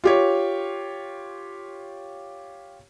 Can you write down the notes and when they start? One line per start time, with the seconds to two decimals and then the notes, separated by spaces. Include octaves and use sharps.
0.04 F4 G4 C#5